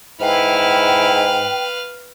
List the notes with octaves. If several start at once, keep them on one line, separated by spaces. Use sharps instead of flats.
G#2 E4 B4 F5 G5